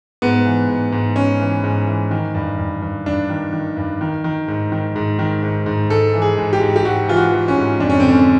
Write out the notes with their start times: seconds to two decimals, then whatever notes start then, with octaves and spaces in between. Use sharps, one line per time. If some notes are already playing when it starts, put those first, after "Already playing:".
0.22 G#2 B3
0.45 E3
0.69 G#2
0.92 G#2
1.16 G#2 C#4
1.40 E3
1.64 G#2
1.87 E3
2.11 D#3
2.34 G2
2.58 G2
2.82 G2
3.06 G2 D4
3.29 D#3
3.53 D#3
3.77 G2
4.01 D#3
4.24 D#3
4.48 G#2
4.72 D#3
4.96 G#2
5.19 D#3
5.43 G#2
5.66 G#2
5.90 G#2 A4
6.14 E3
6.22 G#4
6.38 G#2
6.53 G4
6.61 G#2
6.76 G4
6.85 G#2 F#4
7.09 E3 F4
7.17 F#4
7.32 E3
7.48 C#4
7.56 G#2
7.80 F2 D4
7.90 C#4
8.00 D3 C4
8.10 C#4